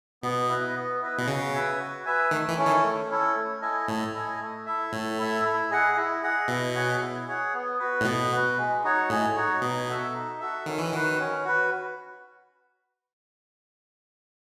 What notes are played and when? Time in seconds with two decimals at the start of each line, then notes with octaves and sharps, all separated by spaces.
0.23 B2 B3
0.49 E4 B4 D#5
0.75 B3
1.02 E4 B4 D#5
1.18 B2
1.27 C#3 F#4
1.53 B4 E5 G#5
1.79 F#4
2.05 B4 E5 G#5
2.31 D#3 A3
2.48 E3
2.57 C#4 E4 A4
2.66 D#3
2.83 A3
3.09 C#4 E4 A4
3.36 A3
3.62 E4 A4 D#5 G#5
3.88 A2 A3
4.14 E4 A4 D#5 G#5
4.40 A3
4.66 E4 A4 E5
4.92 A2 A3
5.18 E4 A4 E5
5.44 E4
5.71 G#4 D#5 F#5
5.97 E4
6.22 G#4 D#5 F#5
6.48 B2 E4
6.75 G#4 C#5 F#5
7.01 E4
7.27 G#4 C#5 F#5
7.53 B3
7.79 F#4 B4
8.01 A2
8.05 B2 B3
8.31 F#4 B4
8.58 G#3
8.84 D#4 F#4 C#5
9.10 A2 G#3
9.36 D#4 F#4 C#5
9.62 B2 D#4
9.88 F#4 A4 E5
10.14 D#4
10.40 F#4 A4 E5
10.66 D#3 C#4
10.78 E3
10.92 D#3 F#4 B4
11.18 C#4
11.44 F#4 B4